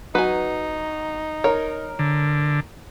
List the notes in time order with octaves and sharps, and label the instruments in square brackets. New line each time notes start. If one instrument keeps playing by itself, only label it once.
[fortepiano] F#3 [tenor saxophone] D#4 [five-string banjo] B4 G#5
[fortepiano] A#4 [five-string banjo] C#5
[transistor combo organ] D3